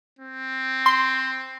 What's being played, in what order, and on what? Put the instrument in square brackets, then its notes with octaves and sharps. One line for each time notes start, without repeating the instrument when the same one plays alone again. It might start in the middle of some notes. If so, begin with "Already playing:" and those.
[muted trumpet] C4
[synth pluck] C6